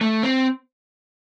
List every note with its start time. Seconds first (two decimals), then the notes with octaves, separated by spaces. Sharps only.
0.01 A3
0.23 C4